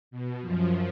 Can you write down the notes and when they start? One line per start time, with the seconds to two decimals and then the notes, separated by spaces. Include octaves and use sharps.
0.11 B2
0.41 F#2 F3